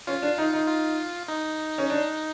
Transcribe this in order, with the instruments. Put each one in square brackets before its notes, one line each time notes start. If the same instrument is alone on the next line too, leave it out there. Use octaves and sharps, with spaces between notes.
[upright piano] C#4 [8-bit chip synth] F4
[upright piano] D4
D#4
D#4
[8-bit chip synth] F4
D#4
[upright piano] C#4
D4